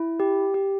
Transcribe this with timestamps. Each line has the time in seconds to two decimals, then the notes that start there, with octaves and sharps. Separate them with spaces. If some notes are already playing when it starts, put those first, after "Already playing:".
Already playing: E4
0.20 G4
0.54 G4